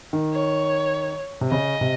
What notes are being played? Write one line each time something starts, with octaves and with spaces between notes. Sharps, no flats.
D#3
C#5
C3
C#3 D#5
C3